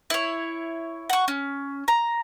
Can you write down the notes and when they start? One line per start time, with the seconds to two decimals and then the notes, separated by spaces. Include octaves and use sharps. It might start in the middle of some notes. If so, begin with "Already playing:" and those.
0.10 E4 C#5
1.10 F#5 C#6
1.28 C#4
1.88 A#5